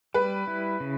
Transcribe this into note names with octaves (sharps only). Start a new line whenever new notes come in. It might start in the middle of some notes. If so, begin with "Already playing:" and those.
G3 B4
E4
C#3